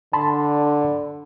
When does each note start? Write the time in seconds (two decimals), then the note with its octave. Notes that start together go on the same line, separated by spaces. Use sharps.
0.13 D3 A5 B5 C6